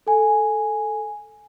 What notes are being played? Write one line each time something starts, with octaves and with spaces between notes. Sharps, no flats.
A4 G#5